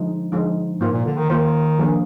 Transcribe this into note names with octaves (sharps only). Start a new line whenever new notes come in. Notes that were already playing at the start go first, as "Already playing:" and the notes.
Already playing: D3 F3 G#3 D#4
D3 F3 G#3 D#4
G#2 A#3 F4 C5
A#2
D3
D#3
D#3 A#3 F4 C5
F3 A#3 D4 G#4